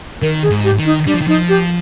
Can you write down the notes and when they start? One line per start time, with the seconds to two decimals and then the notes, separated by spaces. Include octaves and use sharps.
0.22 D#3 A#4
0.43 G#4
0.50 G#2
0.64 G4
0.79 D#3
0.85 D#4
1.06 G3 D4
1.14 F3
1.21 D#3
1.28 F3 D#4
1.49 G4